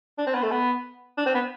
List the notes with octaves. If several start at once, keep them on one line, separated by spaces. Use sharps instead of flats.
D4
C4
B3
A3
B3
D4
C4
B3